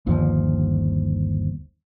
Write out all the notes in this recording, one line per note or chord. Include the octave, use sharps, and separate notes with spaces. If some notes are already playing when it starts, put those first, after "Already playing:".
G1 D#2 F3